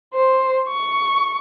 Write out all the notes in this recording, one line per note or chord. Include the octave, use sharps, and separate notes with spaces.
C5
C#6